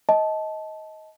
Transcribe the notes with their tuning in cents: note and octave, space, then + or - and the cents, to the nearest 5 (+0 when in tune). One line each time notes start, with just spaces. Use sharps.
D#5 +20 A5 -15